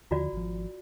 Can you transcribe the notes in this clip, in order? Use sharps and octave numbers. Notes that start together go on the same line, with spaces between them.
D#2 D3 F3 F4 F#4 D5
G#1 F3